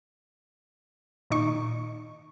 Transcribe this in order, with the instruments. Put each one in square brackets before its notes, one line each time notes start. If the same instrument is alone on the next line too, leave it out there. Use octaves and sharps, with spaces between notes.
[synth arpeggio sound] A#2 D#3 D#4 C#6